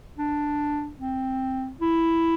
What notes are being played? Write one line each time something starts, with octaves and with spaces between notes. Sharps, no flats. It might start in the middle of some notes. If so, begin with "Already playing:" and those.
D4
C4
E4